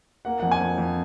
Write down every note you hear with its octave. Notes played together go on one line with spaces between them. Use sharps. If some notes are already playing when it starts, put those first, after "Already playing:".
A#3 F#5
F2 F#5
G#5
F2
F2